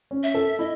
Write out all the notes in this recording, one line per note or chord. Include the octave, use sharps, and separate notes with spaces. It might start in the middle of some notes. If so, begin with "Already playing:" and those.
C#4
E5
A4
E4 D#5